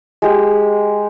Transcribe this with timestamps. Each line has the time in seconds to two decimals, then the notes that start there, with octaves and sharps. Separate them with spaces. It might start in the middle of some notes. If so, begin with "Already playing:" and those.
0.22 G#3 G4